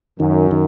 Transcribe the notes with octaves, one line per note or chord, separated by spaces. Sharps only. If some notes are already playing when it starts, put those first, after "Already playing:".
F#2 D#3
D#3